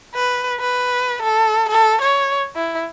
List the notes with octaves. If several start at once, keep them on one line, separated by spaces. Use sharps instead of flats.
B4
B4
A4
A4
C#5
E4